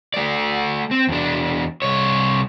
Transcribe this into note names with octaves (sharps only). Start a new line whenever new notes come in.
A3 D5
C4
E2 D4
C2 C#5